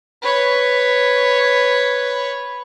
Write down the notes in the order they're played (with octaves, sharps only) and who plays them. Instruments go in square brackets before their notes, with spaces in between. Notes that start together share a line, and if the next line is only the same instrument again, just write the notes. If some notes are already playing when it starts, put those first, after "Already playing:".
[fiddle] B4 C#5